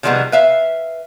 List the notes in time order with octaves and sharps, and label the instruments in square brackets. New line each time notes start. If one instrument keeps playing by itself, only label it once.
[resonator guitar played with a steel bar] C3 D#3 F3 G3 G#3 B3
B4 E5 F5